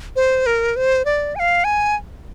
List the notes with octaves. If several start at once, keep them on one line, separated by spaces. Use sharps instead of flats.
C5
A#4
C5
D5
G#5
F5
G#5